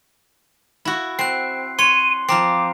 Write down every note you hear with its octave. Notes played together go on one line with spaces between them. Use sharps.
E4 F#4
C4 F#6 C7
C#5 C6 D#7
F3 C4 A#5 D6 C7